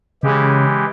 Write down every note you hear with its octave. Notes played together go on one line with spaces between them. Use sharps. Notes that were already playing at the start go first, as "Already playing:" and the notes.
C#3 E3 G#3 G4